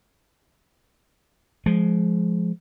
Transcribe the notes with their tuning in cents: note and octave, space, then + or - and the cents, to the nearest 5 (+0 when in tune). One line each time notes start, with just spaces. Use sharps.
F3 +0 G#3 +15